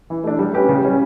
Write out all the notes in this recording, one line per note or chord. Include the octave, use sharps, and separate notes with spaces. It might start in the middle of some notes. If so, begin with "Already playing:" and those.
E3
A3 D4
G3
C#4 G4 B4
C#3
G3 C#4